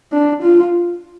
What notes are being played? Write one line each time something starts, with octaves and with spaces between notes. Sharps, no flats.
D4
F4